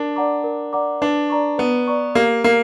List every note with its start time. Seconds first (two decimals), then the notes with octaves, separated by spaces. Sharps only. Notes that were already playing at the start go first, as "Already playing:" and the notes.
Already playing: D4 A#4
0.16 D5 F#5 A#5 D6
0.44 A#4
0.73 D5 F#5 A#5 D6
1.01 D4 B4
1.30 D5 A#5 C#6
1.58 B3 B4
1.87 D5 A#5 C#6
2.15 A#3 G4
2.44 A#3 A#4